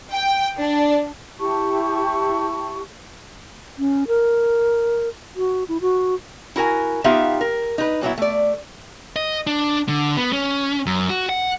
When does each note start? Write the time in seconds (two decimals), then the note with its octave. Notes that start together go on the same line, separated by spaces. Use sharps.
0.12 G5
0.59 D4
1.39 E4 G4 A5 C#6
3.79 C#4
4.08 A#4
5.36 F#4
5.68 E4
5.81 F#4
6.56 E4 F#4 A#4 G#5
7.04 B3 D#4 F4 G4 E5 F5
7.41 A#4
7.78 D#4 B4
8.01 A#2 F#3 B3 E4
8.18 A3 D5
9.16 D#5
9.47 D4
9.89 D3
10.17 B3
10.33 C#4
10.86 F#2
11.10 F#4
11.29 F#5